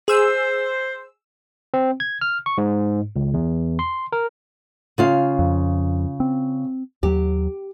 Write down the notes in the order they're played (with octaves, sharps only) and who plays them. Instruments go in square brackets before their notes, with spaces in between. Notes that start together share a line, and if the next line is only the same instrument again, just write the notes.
[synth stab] G#4 E6 [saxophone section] C5
[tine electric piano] C4
G#6
F6
C#6
G#2
C#2
E2
C6
A#4
[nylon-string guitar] C#3 F4 F5
[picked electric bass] F2
C4
[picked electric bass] D#2 F#3 [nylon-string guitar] G4